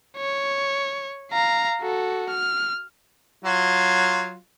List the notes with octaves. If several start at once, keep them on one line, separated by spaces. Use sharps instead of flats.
C#5
F5 A#5
F#4 A4
F6
F#3 F4